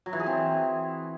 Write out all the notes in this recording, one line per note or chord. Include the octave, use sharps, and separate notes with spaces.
F#3
E3
G#4
C4